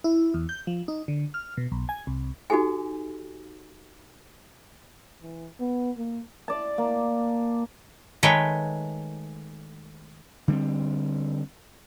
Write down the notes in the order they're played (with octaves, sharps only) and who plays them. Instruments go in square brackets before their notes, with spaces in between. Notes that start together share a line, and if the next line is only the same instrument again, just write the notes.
[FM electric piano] E4
E2
G6
F3
D#4
D3
F6
B2
B1
G#5
C2
[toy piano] D#4 F#4 G4 A4 G#5
[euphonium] E3
B3
A#3
[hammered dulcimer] D5 A5
A#3
[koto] D#3 G#3 A3 B4 C#5 G5
[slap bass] D3 G3 G#3 C4